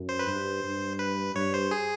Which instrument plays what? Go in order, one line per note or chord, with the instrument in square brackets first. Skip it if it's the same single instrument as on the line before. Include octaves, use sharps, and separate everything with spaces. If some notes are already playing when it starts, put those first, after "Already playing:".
Already playing: [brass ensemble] F#2
[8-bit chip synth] C5
B4
[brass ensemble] G2 [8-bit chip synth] C5
[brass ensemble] G2
[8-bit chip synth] B4
[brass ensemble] G2 [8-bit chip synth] C#5
[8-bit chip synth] C5
G#4